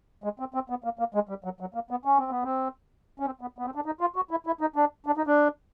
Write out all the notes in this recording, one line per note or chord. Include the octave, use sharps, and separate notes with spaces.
G#3
C4
C4
B3
A#3
A#3
G#3
G3
F#3
F#3
A#3
B3
C#4
C4
B3
C4
C#4
C4
B3
B3
C4
D4
D#4
F4
F#4
E4
E4
D#4
D4
D4
D#4
D4